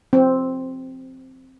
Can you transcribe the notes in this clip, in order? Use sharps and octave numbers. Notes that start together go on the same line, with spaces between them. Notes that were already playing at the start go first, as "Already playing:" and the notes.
C4